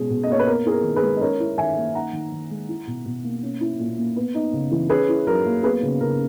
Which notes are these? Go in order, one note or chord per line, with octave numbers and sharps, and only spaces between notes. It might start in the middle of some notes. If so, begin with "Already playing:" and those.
Already playing: B2 G#3 C#4 G#4
B2
D#5
A#3 C#5
B4
B3 A#4
E4 G#4
A#4
D#3
G#4 B4
G#3
D#5
C#4 A#4 C#5
E4
D#3 E5 G#5
A#3
D#4 F#5 A#5
D#3
D#3
G#3
E4
B2
B2
A#3
C#4
E4
A#2
A#3
B3
D#4
C#3
E3
C#4 G#4 B4
E4
F#3 A#4
A#3
B3 G#4 B4
C#3
C#3 A#4